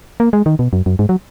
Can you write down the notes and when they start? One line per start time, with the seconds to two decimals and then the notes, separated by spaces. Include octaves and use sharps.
0.20 A#3
0.33 G#3
0.46 D#3
0.59 B2
0.73 F#2
0.86 F#2
0.99 G#2
1.09 F#3